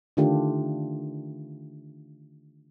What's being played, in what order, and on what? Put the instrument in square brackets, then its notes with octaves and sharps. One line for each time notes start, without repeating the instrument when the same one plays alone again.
[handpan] D3 D#3 A3 D4 F4 G4